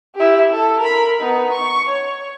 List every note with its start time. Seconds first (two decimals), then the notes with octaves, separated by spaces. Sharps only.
0.15 E4 G4
0.51 A4
0.80 A#4 B5
1.20 B3 D#4
1.52 C#6
1.88 C#5